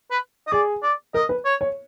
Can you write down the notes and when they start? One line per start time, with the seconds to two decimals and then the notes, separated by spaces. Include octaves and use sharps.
0.11 B4
0.47 D#5
0.52 G#4 D5
0.83 D5
1.14 A#4 D#5
1.29 B4
1.45 C#5
1.61 C#5